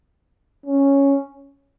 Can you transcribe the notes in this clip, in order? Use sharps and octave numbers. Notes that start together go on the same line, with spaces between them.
C#4